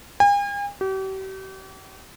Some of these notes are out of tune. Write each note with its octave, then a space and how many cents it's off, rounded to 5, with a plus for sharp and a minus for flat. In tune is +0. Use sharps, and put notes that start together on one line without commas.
G#5 -45
G4 -40